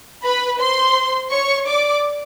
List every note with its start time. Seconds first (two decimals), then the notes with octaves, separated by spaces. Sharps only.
0.24 B4 B5
0.61 C5 C6
1.32 C#5 C#6
1.68 D5 D6